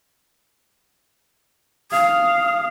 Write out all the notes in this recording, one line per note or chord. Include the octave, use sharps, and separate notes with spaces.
F5 D#6